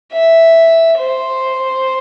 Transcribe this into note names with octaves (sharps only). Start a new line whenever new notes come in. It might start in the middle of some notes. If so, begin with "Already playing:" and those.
E5
C5